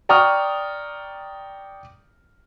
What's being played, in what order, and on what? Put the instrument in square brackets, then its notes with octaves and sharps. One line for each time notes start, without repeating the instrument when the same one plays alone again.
[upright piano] D5 G5 A#5 C#6 D#6 F6